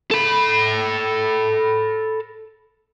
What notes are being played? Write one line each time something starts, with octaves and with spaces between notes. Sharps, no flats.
A4 B5